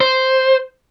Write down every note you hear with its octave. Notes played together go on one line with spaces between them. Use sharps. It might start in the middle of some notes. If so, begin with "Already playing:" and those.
C5